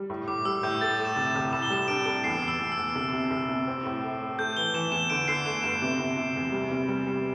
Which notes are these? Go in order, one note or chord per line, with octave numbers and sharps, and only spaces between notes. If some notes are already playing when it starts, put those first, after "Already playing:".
Already playing: G3
A2
A2 D6
G3 E6
A2 G6
A3 A6
A3
E7
C2
C2
A2 E7
G7
G3 E7
D4 D7
A4
E2 C7
E2
E6
E2
E6
E2
C2
C3
C2
C3
C4
A2
A3
A3
A3 G6
E3 G7
E3 E7
E2 E7
D3 D7
D3 C7
A3 E7
G2 E7
C3
C3
C3
E2
G3
C3
G3
G3